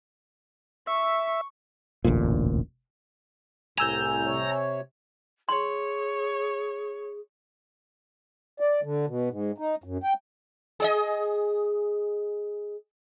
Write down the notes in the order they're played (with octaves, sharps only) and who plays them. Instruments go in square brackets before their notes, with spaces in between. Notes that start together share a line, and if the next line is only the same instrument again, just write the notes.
[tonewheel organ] E5 [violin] C#6
[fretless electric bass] E1 A1 D2 A#2
[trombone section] C2 A2 [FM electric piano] G#5 E6 G6 [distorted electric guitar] A#5
[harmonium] C3 C#5
[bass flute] G#4 [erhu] C#5 [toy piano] C6
[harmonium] D5
D3
B2
G#2
D#4
F#2
G5
[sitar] G#4 D5 D#5